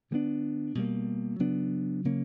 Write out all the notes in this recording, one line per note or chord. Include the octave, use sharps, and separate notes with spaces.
D3 G3 B3 D4
B2 G3 A#3
C#3 F#3 B3 D4
C#3 F#3 A#3 C#4